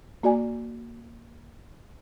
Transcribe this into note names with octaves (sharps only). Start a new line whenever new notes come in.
A#3 F#4 D5 G#5